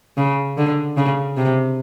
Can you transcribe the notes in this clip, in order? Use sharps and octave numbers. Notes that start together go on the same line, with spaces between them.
C#3
D3
C#3
C3